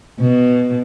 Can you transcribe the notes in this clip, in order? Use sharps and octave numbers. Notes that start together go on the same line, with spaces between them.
B2